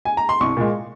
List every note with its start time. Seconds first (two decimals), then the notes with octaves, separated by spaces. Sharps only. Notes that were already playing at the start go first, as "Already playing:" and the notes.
0.05 G#5
0.17 A#5
0.29 C6
0.40 C2 C#6
0.57 A#2 G#3